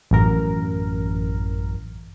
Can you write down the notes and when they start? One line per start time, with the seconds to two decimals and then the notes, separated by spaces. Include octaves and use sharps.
0.11 A1 F#2 A#4